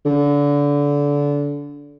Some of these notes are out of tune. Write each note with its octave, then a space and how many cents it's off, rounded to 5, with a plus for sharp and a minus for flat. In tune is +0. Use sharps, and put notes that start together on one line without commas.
D3 -25